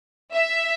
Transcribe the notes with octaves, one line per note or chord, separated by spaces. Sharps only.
E5